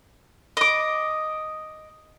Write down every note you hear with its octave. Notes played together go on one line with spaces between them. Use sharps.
D#5 D6